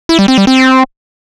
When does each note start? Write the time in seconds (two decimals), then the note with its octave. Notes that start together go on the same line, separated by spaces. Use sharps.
0.09 E4
0.19 G3
0.28 C4
0.38 G3
0.47 C4